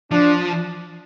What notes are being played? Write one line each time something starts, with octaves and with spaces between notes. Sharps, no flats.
F3 D4